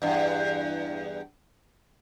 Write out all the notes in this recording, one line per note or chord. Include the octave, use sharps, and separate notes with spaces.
E2 G2